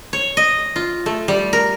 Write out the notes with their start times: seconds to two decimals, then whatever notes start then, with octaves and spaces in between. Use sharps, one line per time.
0.13 C#5
0.37 D#5
0.76 F4
1.06 A3
1.28 G3
1.53 A#4